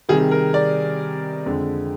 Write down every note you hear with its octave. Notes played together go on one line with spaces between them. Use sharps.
C3 D#3 G3 G#4
A#4
D5
F2 D3 G#3